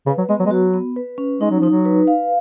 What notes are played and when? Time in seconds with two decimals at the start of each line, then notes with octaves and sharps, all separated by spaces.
0.07 C#3 B4
0.18 F#3
0.29 G#3 B3
0.40 F#3
0.46 G#3
0.51 F#3 F#4
0.74 B3
0.96 B4
1.18 C#4
1.41 G#3 D#4
1.50 F#3
1.60 F3 D#4
1.70 F#3
1.85 B4
2.07 F5